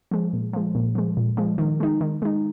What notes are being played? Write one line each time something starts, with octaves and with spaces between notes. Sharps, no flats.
F3 G#3
A#2
F3 G#3
A#2
F3 G#3
A#2
F3 G#3
D#3
G#3 D#4
D#3
G#3 D#4